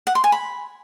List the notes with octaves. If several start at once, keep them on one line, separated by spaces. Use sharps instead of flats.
F#5
C6
G#5
B5